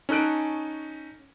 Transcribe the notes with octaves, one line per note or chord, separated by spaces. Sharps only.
C#4 D#4 A4 F#6 D7